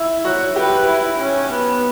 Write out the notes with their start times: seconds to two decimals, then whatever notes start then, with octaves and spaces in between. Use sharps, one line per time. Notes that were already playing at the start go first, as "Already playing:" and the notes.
Already playing: E4
0.25 F#4 C#5
0.56 G4 B4
0.87 E4
1.19 C#4
1.50 B3